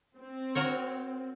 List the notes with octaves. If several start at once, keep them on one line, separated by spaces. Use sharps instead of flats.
C4
F#4 A#4 C#5